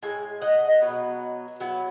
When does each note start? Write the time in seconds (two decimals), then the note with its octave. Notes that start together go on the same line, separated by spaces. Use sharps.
0.02 A2 G#3 G#5
0.41 D#5 F#5
0.81 B2 F#3 B3
1.60 F#3 B3 E4